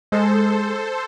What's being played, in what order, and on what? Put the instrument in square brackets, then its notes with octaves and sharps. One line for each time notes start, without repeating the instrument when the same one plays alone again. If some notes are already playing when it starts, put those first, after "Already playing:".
[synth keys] G#3 [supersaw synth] A4 C5